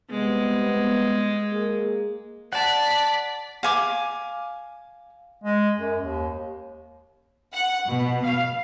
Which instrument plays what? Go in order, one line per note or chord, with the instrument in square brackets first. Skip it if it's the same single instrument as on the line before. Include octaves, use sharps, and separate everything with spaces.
[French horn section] C3 G3 B3 [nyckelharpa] G#3
[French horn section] A#3 G#4
[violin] D5 B6 [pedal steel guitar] F#5 A5
[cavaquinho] F5 G#5 D6
[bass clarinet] G#3
F#2
D#2
[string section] F#5
B2
F5